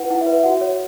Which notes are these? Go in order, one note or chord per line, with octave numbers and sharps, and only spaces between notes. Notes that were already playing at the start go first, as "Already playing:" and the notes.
Already playing: E4 B4 F#5
E4 F#5
E5
B4
E5
F#4 F#5
C#5